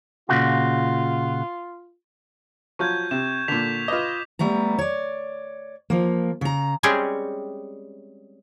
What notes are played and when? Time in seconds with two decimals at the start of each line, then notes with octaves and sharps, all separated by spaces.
0.29 A#2 C#3 F4 F#4
2.79 F3 F#3 F4 C#6 G6 G#6
3.11 C3 E7
3.48 A#2 D3 B6 F7
3.88 F4 B4 D#5 D6
4.39 G3 A3 B3 A#5
4.79 C#5 D5
5.90 F3 A#3
6.41 C#3 A#5
6.83 G3 G#3 C4 C#4 G4 G#4